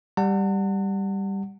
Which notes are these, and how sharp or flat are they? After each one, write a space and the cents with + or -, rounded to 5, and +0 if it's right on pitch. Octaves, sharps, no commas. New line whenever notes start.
G3 +0 F#5 +0 A5 +45